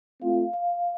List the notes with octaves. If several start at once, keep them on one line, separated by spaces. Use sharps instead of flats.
A3 C4 F4 F5
F5